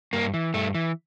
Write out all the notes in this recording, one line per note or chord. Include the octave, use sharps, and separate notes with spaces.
G2 A#3
E3
G2 A3
E3